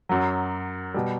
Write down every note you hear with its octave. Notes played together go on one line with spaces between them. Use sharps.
F#2 F#3
B2 G3